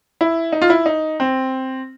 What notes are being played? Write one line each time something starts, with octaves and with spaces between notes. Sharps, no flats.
E4
D#4
F4
E4
D#4
C4